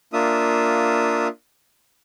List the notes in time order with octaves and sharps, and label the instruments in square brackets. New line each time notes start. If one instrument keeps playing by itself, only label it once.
[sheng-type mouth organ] A#3 D4 F4 E5 D#6